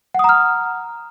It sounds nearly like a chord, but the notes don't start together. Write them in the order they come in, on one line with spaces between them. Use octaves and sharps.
F#5 D#6 A#5 F6